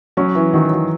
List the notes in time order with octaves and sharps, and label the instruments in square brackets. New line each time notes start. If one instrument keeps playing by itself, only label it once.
[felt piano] F#3 [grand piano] C#4
[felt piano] E3
[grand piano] D#3 [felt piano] F#3
[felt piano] F#3